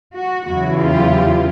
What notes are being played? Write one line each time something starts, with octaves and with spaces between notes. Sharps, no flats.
F#4
E2 C#3 F#3 B3 E4 F#4
F4 G4